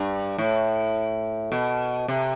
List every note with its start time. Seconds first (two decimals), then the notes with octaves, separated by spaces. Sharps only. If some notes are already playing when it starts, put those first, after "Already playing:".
Already playing: G2
0.38 A2
1.52 B2
2.08 C3